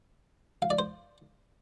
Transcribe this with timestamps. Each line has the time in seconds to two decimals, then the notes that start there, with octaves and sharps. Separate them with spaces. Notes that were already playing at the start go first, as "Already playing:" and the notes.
0.62 F5
0.70 D5
0.79 C5